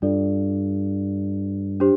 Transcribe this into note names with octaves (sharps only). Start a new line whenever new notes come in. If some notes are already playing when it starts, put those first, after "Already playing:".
G2 D4 F4 A4 D5
D4 G4 C5